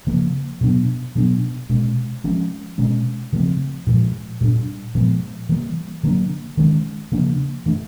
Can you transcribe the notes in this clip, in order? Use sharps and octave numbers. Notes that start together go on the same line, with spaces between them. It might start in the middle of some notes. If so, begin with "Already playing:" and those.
C#3 F3 A#3
B2 F#3 B3 D4
B2 F#3 B3 D4
B2 G#3 C#4
F3 G#3 C#4
B2 G#3 C#4
C#3 F3 A3 C4
A#2 F3 G#3
A#2 G3 B3 D4
A#2 F3 G#3 B3
E3 G3 A#3
D3 F#3 A#3 D4
D#3 G#3 C#4
C#3 F3 A#3 D4
E3 A3 D4